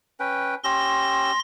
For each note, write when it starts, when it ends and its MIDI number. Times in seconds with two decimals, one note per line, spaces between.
0.20 0.55 61
0.20 0.55 71
0.20 0.55 79
0.64 1.32 61
0.64 1.32 67
0.64 1.40 84
0.64 1.32 88
0.64 1.40 94